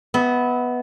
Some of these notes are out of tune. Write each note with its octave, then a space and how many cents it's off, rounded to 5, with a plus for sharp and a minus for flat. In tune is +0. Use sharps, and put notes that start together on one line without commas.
B3 +0 E5 -35